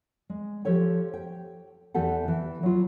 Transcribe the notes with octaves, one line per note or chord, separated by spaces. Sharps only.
G#3
F3 G4 A4 C#5 G5
G5
E2 E3 G4 A4 F#5
E3
F#3 F4